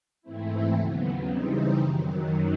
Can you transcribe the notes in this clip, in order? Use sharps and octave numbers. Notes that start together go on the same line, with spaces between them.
G#2 E3 A3 C4 E4
D#2 C#3 F#3 B3
C#3 E3 G3 C4 D#4
F#2 D#3 F#3